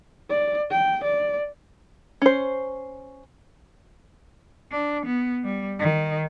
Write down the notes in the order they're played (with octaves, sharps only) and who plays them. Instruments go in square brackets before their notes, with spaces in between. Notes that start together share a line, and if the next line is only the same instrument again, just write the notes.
[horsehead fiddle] D5
G5
D5
[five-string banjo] C#4 C5
[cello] D4
B3
G3
D#3